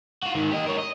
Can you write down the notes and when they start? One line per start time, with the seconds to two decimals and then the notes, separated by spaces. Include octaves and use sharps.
0.23 F4 F#4
0.35 G#2 D#3
0.51 G4 D#5
0.67 A#4 C#5
0.78 D#5